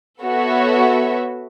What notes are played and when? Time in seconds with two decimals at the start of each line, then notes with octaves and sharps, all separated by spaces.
0.22 B3 F#4 A4 C#5 E5